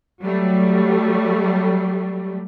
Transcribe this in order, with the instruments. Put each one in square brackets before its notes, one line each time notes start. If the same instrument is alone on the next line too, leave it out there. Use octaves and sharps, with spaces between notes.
[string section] F#3 G3 A3